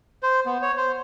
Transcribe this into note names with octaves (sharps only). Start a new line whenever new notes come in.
C5
B3
C#5
C5